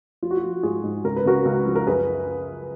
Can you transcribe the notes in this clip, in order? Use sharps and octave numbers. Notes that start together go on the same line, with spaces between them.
F3 F4
F#4
F4
F3
G#2 F4 G#4
G#2
C#2 A#4
B4
C#3 F#4 A#4
C#2
F3
A#4
F#2 G#4 B4